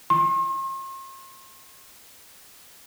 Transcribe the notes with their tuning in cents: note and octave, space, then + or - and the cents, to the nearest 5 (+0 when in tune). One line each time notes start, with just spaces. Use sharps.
C6 +45